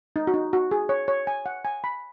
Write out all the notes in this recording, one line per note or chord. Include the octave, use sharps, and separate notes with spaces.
D#4
F#4
D#4
F#4
G#4
C#5
C#5
G#5
F#5
G#5
B5